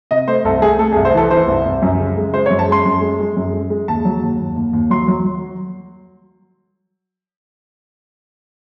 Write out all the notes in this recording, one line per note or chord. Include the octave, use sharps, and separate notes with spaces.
C3 D#5
A3 C5
C2 A4
A3 G#4
A3 A4
G#4
C2
C5
E3 A4
E3 C5
C2
C2
F#2
C#3
G#3
G#3 C5
C#5
F#2
A5
G#3 C6
F#2
G#3
G#3
F#2
G#3
G#3
D#2 A5
F#3
D#2
D#2
D#2
D#2
F#3 C6
F#3
F#3